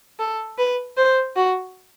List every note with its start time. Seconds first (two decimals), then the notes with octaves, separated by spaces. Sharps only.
0.19 A4
0.58 B4
0.97 C5
1.36 F#4